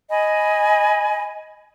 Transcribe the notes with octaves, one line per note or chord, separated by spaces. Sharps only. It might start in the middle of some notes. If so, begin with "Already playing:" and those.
D#5 G#5 B5